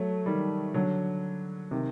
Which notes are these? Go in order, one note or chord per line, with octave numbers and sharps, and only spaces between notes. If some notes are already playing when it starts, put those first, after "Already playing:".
Already playing: F#3 A3
D#3 G3
D3 F#3
C3 D#3